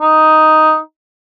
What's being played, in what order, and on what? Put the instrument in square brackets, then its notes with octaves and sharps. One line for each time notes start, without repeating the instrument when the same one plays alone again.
[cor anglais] D#4